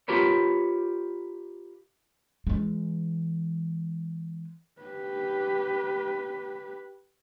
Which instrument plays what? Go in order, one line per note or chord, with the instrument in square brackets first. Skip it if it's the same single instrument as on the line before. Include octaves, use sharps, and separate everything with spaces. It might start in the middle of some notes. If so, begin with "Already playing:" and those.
[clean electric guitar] F4 G4 A#4 B4 C#5
[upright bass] E3 G#3
[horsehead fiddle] G4 B4